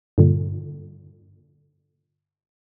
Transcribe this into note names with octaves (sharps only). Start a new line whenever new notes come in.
G2 A#2 D3